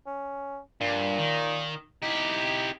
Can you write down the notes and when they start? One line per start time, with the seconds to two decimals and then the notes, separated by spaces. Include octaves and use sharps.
0.06 C#4
0.81 G2 A#2
1.19 D#3
2.02 D#4 E4 G4